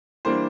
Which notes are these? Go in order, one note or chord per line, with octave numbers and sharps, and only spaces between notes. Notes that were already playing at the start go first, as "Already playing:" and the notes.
E3 G3 A#3 D4 C5